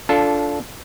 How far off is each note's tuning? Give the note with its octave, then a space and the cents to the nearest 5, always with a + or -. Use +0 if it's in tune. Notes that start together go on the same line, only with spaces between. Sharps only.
D4 -20 F4 +0 A4 +0